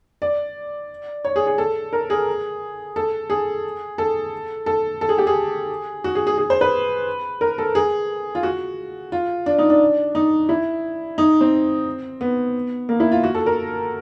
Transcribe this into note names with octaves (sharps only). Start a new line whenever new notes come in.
D5
C#5
G#4
G#4
A4
A#4
G#4
A4
G#4
A4
A4
A4
G#4
G4
G#4
F#4
G#4
G#4
G#4
C5
B4
A#4
A4
G#4
F4
F#4
F4
D4
D#4
D4
D#4
E4
D#4
C4
B3
A#3
E4
F4
F#4
A4
A#4